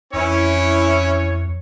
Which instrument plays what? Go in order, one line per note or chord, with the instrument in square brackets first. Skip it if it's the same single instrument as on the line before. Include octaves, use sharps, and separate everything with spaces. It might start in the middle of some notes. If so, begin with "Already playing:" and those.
[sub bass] F2 [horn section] E3 C#5 [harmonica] C#4 E4